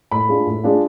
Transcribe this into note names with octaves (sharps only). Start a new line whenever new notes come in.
A2 B5
G#3 D4 F4
A2
G#3 D4 F4